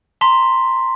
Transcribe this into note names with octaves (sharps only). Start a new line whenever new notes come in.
A5 A#5 C6 B6